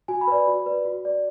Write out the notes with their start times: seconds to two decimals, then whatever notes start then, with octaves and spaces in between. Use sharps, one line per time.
0.08 F#4 G#5
0.21 B5
0.27 B4 D5
0.47 F#4
0.66 B4 D5
0.85 F#4
1.05 D5